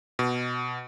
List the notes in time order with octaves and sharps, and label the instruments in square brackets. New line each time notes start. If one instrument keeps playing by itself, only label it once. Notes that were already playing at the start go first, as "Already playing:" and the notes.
[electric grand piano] B2